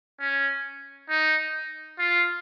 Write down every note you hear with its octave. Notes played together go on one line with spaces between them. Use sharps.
C#4
D#4
F4